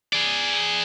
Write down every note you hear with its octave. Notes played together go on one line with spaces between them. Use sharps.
G#4 D5